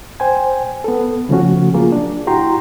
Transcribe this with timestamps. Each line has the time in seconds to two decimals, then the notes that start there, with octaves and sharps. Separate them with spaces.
0.20 C5 G5 G#5
0.84 B3 A4
1.29 C#3 F3 A3 C#4 F#4
1.74 F#3 A#3 F4 G#4
1.92 D4
2.27 E4 F#4 G4 G5 A#5 C6